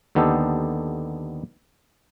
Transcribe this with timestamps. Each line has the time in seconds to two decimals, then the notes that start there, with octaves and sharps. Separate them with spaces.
0.15 D#2 D3 B3 D#4 G4 A4